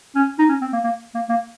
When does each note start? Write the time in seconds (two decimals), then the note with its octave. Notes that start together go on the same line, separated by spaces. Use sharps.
0.15 C#4
0.39 D#4
0.49 C#4
0.61 C4
0.73 A#3
0.84 A#3
1.14 A#3
1.29 A#3